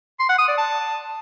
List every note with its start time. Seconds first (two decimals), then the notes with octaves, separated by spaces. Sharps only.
0.19 C6
0.29 F#5
0.38 D#6
0.48 D5
0.57 A5